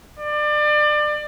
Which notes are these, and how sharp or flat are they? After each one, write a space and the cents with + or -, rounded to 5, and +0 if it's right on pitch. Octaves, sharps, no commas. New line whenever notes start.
D5 +30